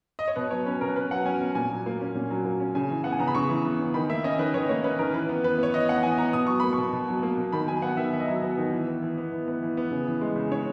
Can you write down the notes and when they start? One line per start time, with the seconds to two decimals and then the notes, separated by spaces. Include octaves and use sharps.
0.19 D#5
0.28 C#5
0.36 B2 B4
0.51 F#3 C#5
0.66 C#4 B4
0.81 B2 A#4
0.96 B2 B4
1.11 F#3 F#5
1.26 C#4 G#5
1.41 B2
1.55 A#2 G#5
1.71 F#3
1.86 A#3
2.01 C#4
2.15 A#2
2.31 F#3
2.45 A#3
2.60 C#4
2.75 C#3 G#5
2.90 E3
3.04 B3 F#5
3.12 G#5
3.19 C#3 A#5
3.27 B5
3.35 C#3 C#6
3.49 E3
3.65 B3
3.80 C#3
3.94 D#3 B5
4.09 A#3 E5
4.24 C#4 D#5
4.39 D#3 B4
4.54 D#3 C#5
4.69 A#3 C#5
4.83 C#4 B4
4.99 D#3 A#4
5.13 E3 B4
5.29 B3
5.44 E3 B4
5.58 B3 C#5
5.74 E3 D#5
5.89 B3 F#5
6.03 E3 G#5
6.18 B3 A#5
6.33 B2 D#6
6.47 F#3 C#6
6.60 A#3 B5
6.73 C#6
6.78 B2
6.93 B2
7.08 F#3
7.23 A#3
7.38 B2
7.52 D#3 B5
7.68 F#3 G#5
7.82 B3 F#5
7.97 D#3 E5
8.13 D#3 E5
8.20 D#5
8.27 F#3 E5
8.42 B3
8.58 D#3
8.72 E3
8.87 B3
9.02 E3
9.18 B3
9.32 E3
9.47 B3
9.62 E3
9.77 B3
9.91 C#3
10.07 E3
10.21 G#3
10.36 C#3
10.51 C#3 C#5